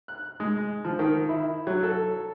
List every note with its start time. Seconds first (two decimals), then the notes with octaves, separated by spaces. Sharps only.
0.08 F#6
0.40 G#3
0.85 F3
0.99 D#3
1.29 E4
1.67 F#3
1.83 A4